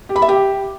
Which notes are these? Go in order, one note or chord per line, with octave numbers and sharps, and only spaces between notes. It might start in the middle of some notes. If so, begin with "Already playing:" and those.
G4
B5
E5
G4